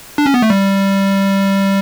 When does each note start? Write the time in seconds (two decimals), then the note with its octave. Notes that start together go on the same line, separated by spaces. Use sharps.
0.18 D4
0.26 C#4
0.34 B3
0.42 A3
0.50 G3